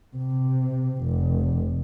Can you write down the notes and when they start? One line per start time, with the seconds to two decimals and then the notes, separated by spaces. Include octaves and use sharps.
0.17 C3
1.03 F1